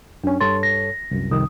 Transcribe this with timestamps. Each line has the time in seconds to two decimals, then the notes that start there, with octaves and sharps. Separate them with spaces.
0.24 F#2 C#4 D4
0.40 G2 A4 C#5 C6 A6
0.63 A#6
1.11 C2 F#2
1.31 C2 F2 D#3 D#6